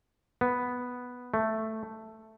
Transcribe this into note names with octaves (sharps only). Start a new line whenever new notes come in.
B3
A3